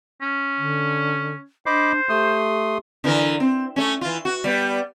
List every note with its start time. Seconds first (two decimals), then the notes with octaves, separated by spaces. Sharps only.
0.22 C#4
0.57 D3
1.66 D4 C5 D#5 B5 D6
2.09 A3 G4 C6 D#6
3.04 D3 E3 A#4
3.40 C4
3.76 A3 C#4
4.01 E3 F4
4.25 F#4
4.44 G3 B3